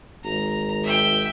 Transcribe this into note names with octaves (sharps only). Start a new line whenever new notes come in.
G#1 A#5
E5 G5